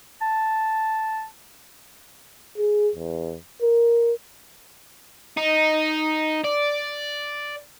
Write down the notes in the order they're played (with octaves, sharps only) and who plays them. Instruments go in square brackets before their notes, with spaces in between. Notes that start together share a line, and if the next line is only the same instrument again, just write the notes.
[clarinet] A5
[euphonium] G#4
E2
A#4
[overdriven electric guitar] D#4
D5